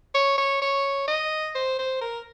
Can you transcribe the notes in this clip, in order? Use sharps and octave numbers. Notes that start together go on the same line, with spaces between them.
C#5
C#5
C#5
D#5
C5
C5
A#4